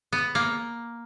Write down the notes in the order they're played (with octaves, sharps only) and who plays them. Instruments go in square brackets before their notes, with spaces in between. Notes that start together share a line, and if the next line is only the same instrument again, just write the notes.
[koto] B3
A#3